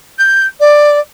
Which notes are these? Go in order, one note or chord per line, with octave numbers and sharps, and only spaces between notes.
G6
D5